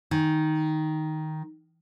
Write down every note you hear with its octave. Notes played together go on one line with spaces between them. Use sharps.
D#3 D#4